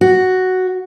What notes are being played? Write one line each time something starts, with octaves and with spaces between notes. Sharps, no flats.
F#4